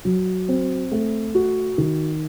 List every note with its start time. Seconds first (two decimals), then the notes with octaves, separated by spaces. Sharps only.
0.05 F#3
0.49 C4
0.92 A3
1.35 F#4
1.78 D#3